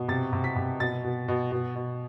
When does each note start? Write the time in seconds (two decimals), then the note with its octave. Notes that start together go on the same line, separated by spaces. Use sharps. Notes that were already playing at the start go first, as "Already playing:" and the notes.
Already playing: B2
0.08 C3 A6
0.33 C3
0.44 B6
0.56 C3
0.80 B2 A6
1.04 B2
1.28 B2
1.52 B2
1.76 B2